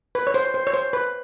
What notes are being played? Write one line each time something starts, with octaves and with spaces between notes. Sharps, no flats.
B4
C#5
C5
C5
C#5
C5
B4